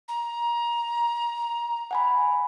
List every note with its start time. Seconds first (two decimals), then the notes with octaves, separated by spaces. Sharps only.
0.08 A#5
1.91 F#5 G#5 B5